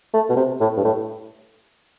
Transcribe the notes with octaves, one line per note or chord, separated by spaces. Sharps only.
A3
B2
C3
A2
G2
A2